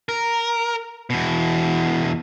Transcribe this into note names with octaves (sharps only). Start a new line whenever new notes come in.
A#4
E2 B2